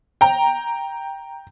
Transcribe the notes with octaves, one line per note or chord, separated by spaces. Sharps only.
G5 A#5